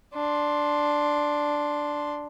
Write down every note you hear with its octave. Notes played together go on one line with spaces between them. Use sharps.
D4 C6